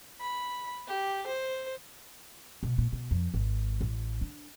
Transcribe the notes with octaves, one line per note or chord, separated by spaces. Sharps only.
B5
G4
C5
B2
A#2
B2
F2
G#1
A1
D4